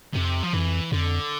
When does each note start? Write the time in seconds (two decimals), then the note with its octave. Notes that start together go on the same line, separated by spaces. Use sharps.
0.14 F2 C3
0.43 F3
0.53 F2 E3
0.92 F2 D3